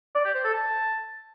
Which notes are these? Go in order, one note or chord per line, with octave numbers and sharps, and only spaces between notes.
D5
G4
C5
A4
A5